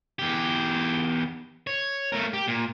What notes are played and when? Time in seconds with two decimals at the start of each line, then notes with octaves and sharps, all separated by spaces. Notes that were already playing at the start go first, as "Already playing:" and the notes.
0.19 E2 G4
1.67 C#5
2.12 A3 A#4
2.33 G4
2.48 A#2